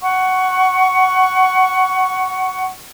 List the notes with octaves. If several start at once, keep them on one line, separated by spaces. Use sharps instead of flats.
F#5 C#6